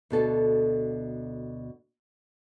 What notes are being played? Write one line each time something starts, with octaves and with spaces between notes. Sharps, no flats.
D2 B2 A4 D5